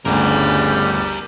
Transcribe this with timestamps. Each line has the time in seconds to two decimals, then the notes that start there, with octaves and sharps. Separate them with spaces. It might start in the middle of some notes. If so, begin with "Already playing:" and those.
0.05 G1 D2 C#3 G3 G4 A#4